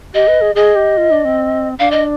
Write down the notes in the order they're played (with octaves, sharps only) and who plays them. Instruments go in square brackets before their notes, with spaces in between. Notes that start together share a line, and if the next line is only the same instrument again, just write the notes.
[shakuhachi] G4 [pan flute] D#5
[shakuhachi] B4
G#4
[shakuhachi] G#4 [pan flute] D#5
[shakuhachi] G4
F4
D4
C4
[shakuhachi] D4 [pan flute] F5
[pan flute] D#5